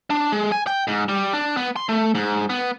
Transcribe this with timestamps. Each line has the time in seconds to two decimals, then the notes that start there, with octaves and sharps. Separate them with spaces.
0.10 D4
0.32 G#3
0.52 G#5
0.67 G5
0.87 G#2
1.09 G3
1.33 D4
1.57 B3
1.76 C6
1.89 A3
2.15 G#2
2.50 B3